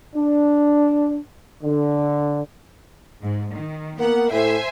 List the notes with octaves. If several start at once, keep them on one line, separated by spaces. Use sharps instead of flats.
D4
D3
G#2
D#3
A#3 B3 F#5
A2 C5 E5 G#5